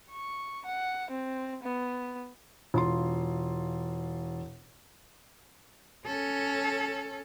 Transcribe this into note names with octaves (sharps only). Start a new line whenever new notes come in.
C#6
F#5
C4
B3
E1 F4 C6
C#4 A4